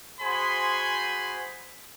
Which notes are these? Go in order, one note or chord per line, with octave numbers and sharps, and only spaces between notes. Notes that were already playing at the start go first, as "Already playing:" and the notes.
F#4 G#4 C5 G#5 B5 C6